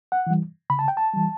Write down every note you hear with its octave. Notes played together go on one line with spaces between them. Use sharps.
F#5
E3 G3
C#3 B5
A5
G5
A5
E3 G3